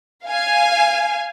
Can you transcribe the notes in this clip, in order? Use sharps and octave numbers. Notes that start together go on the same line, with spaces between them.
F5 G#5